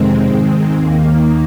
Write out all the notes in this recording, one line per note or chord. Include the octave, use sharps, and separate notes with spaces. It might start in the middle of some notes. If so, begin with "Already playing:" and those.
Already playing: F2 C3 D#3 G#3 C4
G#2 D#3 G#3 C4
D#2 D#3 A#3